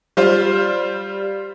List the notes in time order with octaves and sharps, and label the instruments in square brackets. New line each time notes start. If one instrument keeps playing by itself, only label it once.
[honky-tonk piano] G3 F4 C5